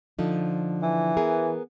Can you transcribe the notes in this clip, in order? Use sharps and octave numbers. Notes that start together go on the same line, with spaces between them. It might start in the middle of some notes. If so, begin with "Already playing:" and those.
D3 F3 D#4
E3
B3 G#4 A#4